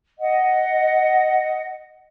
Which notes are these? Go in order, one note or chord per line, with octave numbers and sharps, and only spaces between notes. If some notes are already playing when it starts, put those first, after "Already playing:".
D#5 F#5